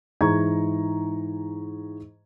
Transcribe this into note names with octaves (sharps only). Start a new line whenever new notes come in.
G#2 E3 G#4 A#5 C#6 G#6